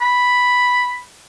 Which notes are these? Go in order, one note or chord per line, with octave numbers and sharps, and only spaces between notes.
B5